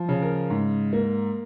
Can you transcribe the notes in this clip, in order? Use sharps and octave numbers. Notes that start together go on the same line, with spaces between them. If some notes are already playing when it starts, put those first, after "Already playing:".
Already playing: F3
C#3
A#4
G#2
A#3